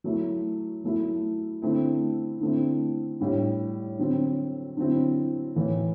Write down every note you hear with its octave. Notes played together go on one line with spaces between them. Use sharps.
F#3 A3 E4
F#3 A3 E4
D3 A3 C4 E4
D3 A3 C4 E4
A2 G3 D4
D3 F#3 C4
D3 F#3 C4 E4
A2 E3 A3